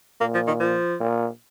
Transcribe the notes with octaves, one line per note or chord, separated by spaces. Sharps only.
A#2 A#3
F3
D#3
F3
A#2